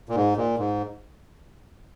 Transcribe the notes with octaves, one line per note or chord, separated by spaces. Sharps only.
A#2
G#2
A#2
G#2